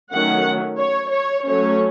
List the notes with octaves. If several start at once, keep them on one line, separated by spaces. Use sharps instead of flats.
D#3 F#3 A3 C#4 F#5
C#5
C#5
F#3 A3 C#4 C#5